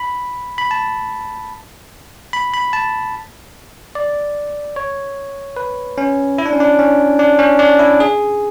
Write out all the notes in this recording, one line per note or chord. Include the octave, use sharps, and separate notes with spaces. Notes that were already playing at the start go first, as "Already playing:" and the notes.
Already playing: B5
B5
A5
B5
B5
A5
D5
C#5
B4
C#4
E4
D4
C#4
D4
C#4
D4
C#4
D4
E4
G#4